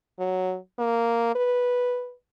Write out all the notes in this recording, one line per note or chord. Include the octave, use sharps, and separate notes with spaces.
F#3
A#3
B4